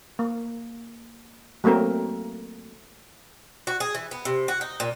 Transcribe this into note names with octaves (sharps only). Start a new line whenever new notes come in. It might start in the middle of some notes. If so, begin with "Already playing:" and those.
A#3
F#3 A3 A#3 C4 A#4
F#4
G#4
E3
B3
C3
F#4
D#4
A#2